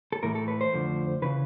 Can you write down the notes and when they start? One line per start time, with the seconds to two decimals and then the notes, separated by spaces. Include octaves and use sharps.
0.12 A4
0.23 A2 E3 A3 A#4
0.35 A4
0.48 B4
0.61 C5
0.73 F2 D3 F3 A3
1.22 C#3 E3 B4